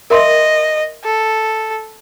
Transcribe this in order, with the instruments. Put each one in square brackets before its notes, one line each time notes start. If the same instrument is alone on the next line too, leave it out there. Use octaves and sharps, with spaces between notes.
[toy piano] A#4 E5 C6 [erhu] D#5
[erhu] A4